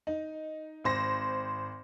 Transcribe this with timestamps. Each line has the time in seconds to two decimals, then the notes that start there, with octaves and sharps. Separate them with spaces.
0.07 D#4
0.84 G#1 C5 A#6